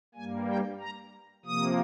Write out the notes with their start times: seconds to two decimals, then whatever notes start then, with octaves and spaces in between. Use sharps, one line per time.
0.14 G2 G3 A#3 G#5
0.48 G5
0.80 A#5
1.45 C3 F3 A#3 D#6